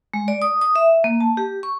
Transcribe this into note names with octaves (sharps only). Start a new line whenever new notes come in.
G#3
D5
D#6
D#6
E5
A#3
A5
G4
C#6